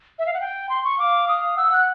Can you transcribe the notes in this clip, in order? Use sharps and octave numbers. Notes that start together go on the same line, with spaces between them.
E5
F5
F#5
G5
C6
C#6
F5 D6
D#6
F#5 E6
F#6